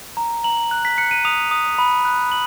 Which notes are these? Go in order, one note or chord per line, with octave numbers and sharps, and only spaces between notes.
A#5
A#5 F#7
F#6
B6
F#6 C#7
D#7
D#6 F7
D#6
B5
F#6
F#7